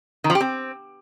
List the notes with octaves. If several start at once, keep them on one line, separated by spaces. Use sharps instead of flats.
D#3
F3
G4
C4